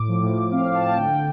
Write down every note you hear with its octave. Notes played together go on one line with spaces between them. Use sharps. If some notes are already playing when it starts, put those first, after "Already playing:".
Already playing: A2 D6
F3
A2
A2
C4 F5
F3 F5
A5
A2 G5
D3 G5